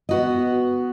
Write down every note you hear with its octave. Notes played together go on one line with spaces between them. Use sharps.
B3 F#4 D#5